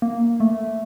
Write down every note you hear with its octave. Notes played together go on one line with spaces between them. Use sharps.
A#3
A3